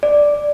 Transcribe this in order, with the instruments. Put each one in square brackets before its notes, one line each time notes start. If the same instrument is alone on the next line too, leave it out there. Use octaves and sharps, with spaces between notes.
[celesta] D5